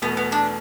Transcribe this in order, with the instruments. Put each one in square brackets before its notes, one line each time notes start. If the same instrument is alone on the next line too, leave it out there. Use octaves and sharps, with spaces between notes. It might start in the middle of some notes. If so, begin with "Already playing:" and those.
[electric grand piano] E2 B2 A3 [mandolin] B3
[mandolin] B3
D4